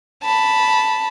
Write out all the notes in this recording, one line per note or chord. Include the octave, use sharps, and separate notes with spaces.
A5 B5